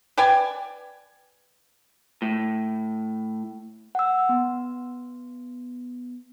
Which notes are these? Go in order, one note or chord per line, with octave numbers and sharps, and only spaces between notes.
B4 D5 G5 G#5
A2
F#5 E6
B3